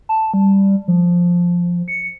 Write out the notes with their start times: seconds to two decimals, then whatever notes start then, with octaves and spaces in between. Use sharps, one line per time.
0.09 A5
0.34 G3
0.88 F3
1.88 C#7